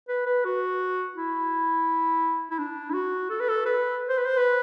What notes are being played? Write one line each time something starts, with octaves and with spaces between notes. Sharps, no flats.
B4
B4
F#4
E4
E4
D4
E4
F#4
A4
B4
A4
B4
C5
B4
C5
B4